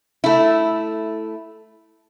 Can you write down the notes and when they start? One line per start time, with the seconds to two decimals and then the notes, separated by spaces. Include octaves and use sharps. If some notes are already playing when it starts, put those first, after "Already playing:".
0.24 A3 E4